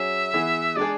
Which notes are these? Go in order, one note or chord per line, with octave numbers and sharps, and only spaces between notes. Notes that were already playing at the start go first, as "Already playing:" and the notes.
Already playing: F#3 C#4 G#4 E5
E3 B3 E4 G#4
G#3 D4 G#4 D5